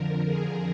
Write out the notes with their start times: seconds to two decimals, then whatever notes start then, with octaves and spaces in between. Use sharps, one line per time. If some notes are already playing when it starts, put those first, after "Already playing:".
Already playing: F2 D3 F3 A#4
0.27 G#4